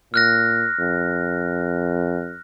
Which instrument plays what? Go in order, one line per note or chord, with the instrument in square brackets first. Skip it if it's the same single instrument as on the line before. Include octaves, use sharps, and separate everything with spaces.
[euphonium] A#2 [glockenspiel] F6 F#6 A#6
[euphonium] F2